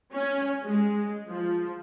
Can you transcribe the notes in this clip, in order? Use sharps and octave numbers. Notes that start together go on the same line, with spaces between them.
C#4
G#3
F3